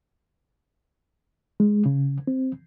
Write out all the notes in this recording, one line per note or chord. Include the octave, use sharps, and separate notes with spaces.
G#3
C#3
C4